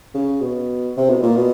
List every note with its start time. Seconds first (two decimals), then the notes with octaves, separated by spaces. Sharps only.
0.14 C#3
0.41 B2
0.97 C3
1.10 B2
1.23 A#2
1.36 B2